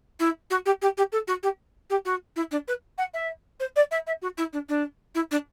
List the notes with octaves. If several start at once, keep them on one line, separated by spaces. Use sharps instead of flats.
E4
F#4
G4
G4
G4
A4
F#4
G4
G4
F#4
E4
D4
B4
F#5
E5
C5
D5
E5
E5
F#4
E4
D4
D4
E4
D4